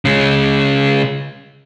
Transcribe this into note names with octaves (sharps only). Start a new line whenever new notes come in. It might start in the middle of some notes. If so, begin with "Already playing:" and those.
C#3 G#3